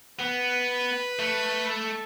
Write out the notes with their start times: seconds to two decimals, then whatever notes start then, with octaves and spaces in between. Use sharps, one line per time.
0.20 B3 B4
1.19 A3
1.69 A4